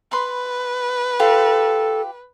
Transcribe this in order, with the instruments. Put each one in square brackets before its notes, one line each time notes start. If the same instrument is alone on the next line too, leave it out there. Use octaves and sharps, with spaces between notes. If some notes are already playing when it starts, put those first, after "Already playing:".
[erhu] B4 [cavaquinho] B5 C6
[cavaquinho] F4 G4 D6 [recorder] A4